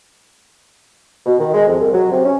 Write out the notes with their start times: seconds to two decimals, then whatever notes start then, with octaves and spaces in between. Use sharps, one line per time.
1.26 B2
1.39 D#3
1.54 G#3
1.67 F2
1.79 C2
1.92 F#3
2.11 C3
2.24 C#4